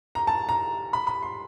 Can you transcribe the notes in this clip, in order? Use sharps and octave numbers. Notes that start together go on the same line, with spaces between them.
A#5
A5
A#5
B5
B5
C6